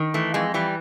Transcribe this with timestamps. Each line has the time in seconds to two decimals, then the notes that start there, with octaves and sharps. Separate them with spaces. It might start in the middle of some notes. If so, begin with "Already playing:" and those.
Already playing: D#3
0.14 E3 A3
0.34 F2 G#3
0.54 E3 G3